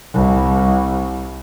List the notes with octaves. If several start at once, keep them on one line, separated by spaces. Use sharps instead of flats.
C2